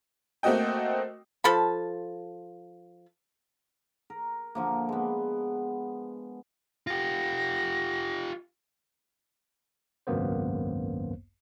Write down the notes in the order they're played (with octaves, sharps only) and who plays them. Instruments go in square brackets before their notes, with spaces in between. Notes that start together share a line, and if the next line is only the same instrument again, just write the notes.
[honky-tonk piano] A3 A#3 C4 F#4 D#5 G5
[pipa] F3 A4 A5 B5
[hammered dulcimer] A#4
D3 F3 A#3
G#3 B3
[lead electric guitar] F4 G4 [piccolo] A#6
[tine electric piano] G#1 C#2 F#2 A#3 B3 C5